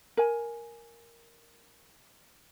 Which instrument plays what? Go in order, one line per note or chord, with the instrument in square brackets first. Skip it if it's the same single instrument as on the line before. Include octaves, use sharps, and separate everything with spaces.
[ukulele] A#4 G#5